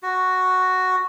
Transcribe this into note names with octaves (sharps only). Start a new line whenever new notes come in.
F#4